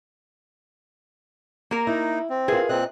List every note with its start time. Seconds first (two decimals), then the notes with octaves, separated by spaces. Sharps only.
1.71 A#3 A#4
1.87 D#4 E4
2.30 C4
2.48 E4 F4 G#4 A#4 B4
2.69 A#2 C4 D#5 F#6